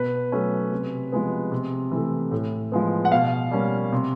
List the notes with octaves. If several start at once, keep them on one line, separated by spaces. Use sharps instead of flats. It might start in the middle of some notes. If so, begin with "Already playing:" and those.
Already playing: B2 B4
F#3 A3 C#4
C3
F3 G#3 B3
C3
E3 A3
A2
F3 G#3 B3
F#5
B2 F5
G3 A#3 C#4
C3